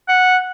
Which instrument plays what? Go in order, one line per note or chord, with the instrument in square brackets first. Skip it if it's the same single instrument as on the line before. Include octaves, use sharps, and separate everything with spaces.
[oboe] F#5